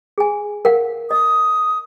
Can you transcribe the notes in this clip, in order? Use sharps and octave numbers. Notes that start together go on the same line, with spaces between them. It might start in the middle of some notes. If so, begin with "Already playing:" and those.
G#4 G#5
A#4 F5 F#5
D#5 D#6